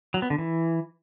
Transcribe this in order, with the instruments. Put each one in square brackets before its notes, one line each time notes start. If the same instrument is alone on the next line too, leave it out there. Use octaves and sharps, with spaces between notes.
[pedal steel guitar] F#3
B3
D3
E3